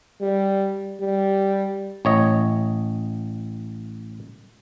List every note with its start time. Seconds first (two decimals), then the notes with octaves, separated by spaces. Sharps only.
0.21 G3
1.01 G3
2.05 A1 C#5 D#5